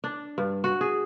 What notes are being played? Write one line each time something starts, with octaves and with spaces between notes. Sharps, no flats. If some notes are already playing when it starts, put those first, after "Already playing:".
D4
G2
F#4
G#4